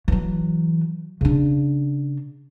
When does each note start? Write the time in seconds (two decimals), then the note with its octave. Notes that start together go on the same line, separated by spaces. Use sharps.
0.08 E3 F#3
1.21 C#3 D4